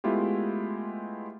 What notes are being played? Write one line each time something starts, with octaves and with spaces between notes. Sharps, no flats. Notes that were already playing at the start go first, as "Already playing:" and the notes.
G#3 A3 B3 E4 F4 G4